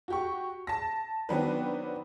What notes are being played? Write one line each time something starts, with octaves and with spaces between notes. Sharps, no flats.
F#4 G4 C#6
A5 A#6
D#3 F#3 B3 C4 D4 B4